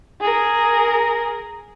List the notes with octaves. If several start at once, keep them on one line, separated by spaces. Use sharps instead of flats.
G#4 A#4